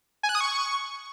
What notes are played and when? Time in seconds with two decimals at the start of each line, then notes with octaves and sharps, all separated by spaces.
0.23 G#5
0.29 F#6
0.35 D#6
0.41 C#6